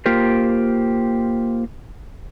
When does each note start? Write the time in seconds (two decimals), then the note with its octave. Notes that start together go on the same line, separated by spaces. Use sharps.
0.06 A#3 F4 G4 A#4 C5